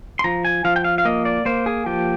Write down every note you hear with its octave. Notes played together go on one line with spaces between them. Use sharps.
C6
F3 A#5
G#5
F3 F5
G5
F5
F5
A#3 D#5
D5
A#3 C5
G#4
F3 G4